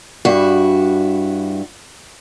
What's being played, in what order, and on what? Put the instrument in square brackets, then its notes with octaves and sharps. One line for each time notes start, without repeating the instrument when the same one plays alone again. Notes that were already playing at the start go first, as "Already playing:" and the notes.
[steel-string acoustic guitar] G2 E4 F#4